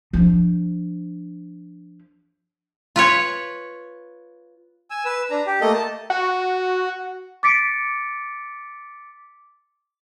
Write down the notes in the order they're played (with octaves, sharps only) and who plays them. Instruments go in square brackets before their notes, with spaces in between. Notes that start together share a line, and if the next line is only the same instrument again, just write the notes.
[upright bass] F3 D4
[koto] F4 B4 C#5
[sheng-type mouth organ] G#5 E6
B4 E6
D4 A#5
G4
A3 A#3 A4 D#5
A5
[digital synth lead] F#4
[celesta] D6 A6 B6 C#7 D7